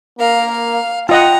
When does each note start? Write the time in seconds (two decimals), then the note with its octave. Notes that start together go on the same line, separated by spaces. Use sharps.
0.19 A#3 A#4 F5
0.52 F5
1.09 F4 D#5 F#5 G5 A#5